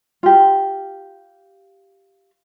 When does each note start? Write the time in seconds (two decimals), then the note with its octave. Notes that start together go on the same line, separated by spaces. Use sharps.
0.23 F4 G4